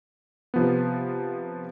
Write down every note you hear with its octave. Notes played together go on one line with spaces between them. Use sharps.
C3 F3 B3